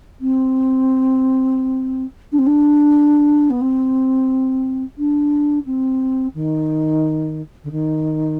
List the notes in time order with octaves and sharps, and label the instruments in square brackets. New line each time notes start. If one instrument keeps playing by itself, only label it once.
[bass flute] C4
D4
C4
D4
B3
C4
D4
C4
D#3
D3
D#3